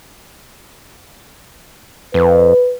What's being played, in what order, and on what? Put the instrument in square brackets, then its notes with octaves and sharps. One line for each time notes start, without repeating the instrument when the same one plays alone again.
[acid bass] F2 [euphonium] B4